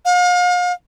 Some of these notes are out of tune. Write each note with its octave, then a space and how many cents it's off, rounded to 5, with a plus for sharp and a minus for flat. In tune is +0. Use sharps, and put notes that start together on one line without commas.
F5 +40